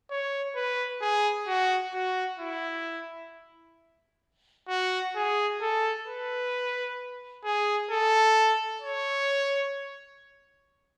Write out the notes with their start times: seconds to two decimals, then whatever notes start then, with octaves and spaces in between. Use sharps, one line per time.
0.10 C#5
0.56 B4
1.02 G#4
1.47 F#4
1.94 F#4
2.39 E4
4.68 F#4
5.15 G#4
5.61 A4
6.07 B4
7.45 G#4
7.91 A4
8.81 C#5